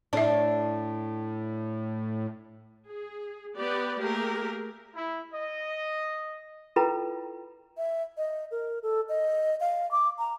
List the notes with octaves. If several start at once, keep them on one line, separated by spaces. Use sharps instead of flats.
A2 D4 E5 A5
G#4
B3 G4 B4 D5
A3 A#3 G4 G#4 A#4
E4
D#5
E4 F4 A4 B4 G5 A#5
E5
D#5
A#4
A4
D#5
F5
D6
A#5